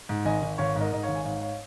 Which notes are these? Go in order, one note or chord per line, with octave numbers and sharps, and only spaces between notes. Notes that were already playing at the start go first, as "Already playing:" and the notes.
G#2
G#1 D#5 G#5
G#1
G#1 C#5 F5
G#2 A#4 D#5
G#2 D#5
C#5 F5
G#1
G#5
G#2 C#5 F5
C#5 F5